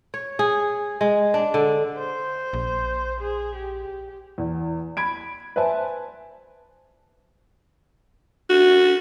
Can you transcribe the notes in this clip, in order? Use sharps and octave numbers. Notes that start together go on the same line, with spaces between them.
C#5
G#4
G#3
D4
D3
C5
A#1
G#4
G4
E2
B5 G#6 D7
B4 C5 E5 G#5 A5
F#4